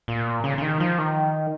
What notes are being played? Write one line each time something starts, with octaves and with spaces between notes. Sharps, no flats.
A#2
C#3
C#3
D#3
F3
D#3